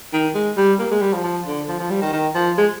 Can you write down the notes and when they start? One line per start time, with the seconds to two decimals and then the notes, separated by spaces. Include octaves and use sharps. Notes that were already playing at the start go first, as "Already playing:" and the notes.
0.13 D#3
0.35 G#3
0.57 G3
0.79 A#3
0.91 G#3
1.02 G3
1.13 F3
1.24 F3
1.46 D3
1.68 F3
1.79 F3
1.90 G3
2.02 D#3
2.13 D#3
2.35 F3
2.58 G#3